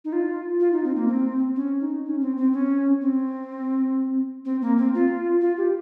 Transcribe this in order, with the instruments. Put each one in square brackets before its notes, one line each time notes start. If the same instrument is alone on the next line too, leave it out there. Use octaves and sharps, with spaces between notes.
[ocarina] D#4
F4
F4
D#4
C4
A#3
C4
C#4
D#4
C#4
C4
C4
C#4
C4
C4
A#3
C4
F4
F4
G4